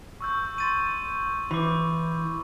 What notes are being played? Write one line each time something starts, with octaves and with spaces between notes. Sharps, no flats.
C#6 E6 G6
C6 A6 D#7
E3 B5 D6